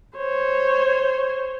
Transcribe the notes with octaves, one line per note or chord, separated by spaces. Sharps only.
C5 C#5